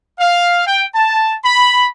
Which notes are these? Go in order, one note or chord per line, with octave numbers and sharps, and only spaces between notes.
F5
G5
A5
B5